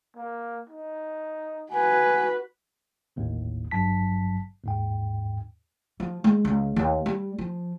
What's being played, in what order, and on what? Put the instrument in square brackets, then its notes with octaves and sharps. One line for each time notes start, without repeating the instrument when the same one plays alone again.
[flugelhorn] A#3
D#4
[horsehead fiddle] F#4 B4 [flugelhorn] G#5
[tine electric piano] G#1 D#2 A2
G#1 G2 F#3 A5 B6
D#2 G#2 G5
[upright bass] F3
G#3
C#2
D#2
G3
F3